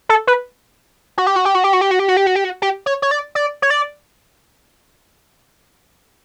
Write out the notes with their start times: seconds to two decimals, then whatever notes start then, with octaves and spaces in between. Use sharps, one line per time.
0.09 A4
0.27 B4
1.18 F#4
1.27 G4
1.36 F#4
1.45 G4
1.54 F#4
1.64 G4
1.73 F#4
1.81 G4
1.91 F#4
1.99 G4
2.08 F#4
2.17 G4
2.26 F#4
2.36 G4
2.44 F#4
2.62 G4
2.86 C#5
3.02 C#5
3.11 D5
3.35 D5
3.62 C#5
3.70 D5